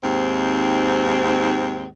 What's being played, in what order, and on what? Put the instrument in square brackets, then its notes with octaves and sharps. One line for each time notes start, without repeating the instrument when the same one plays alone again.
[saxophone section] D#2 G#2 C4